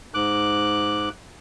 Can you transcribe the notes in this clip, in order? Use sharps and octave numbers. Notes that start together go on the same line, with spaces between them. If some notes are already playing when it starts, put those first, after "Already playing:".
G#2 D6 F#6